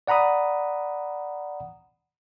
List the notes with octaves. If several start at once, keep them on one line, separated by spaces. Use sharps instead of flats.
D5 F#5 A#5 B5 D#6